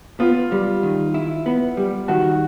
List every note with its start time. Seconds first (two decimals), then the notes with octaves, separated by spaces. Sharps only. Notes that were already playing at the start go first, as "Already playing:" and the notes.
0.20 B3 F4
0.52 G3
0.83 D#3
1.14 E4
1.46 B3
1.77 G3
2.08 D#3 F#4